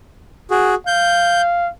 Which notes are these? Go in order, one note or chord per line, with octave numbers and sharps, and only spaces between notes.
F#4 G#4
F5 G6